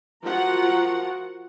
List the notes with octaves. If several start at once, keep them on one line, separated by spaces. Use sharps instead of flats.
F3 F4 F#4 A#4 F#5